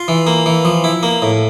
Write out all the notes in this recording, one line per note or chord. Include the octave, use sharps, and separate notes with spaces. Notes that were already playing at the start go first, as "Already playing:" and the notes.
Already playing: F4
E3
A#3
E3
F3
E4
A#3
A2